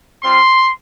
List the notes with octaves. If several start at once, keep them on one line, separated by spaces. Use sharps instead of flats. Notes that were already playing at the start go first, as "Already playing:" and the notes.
G3 C4 F4 C6